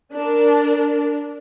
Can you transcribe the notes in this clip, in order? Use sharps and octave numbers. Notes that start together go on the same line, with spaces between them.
D4 A#4